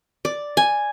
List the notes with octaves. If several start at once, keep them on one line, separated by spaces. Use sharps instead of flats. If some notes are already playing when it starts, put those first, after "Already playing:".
D5
G#5